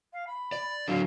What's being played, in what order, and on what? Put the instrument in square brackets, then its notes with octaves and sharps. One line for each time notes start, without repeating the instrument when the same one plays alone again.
[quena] F5
B5
[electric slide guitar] D5
[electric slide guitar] D3 F#3 [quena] F5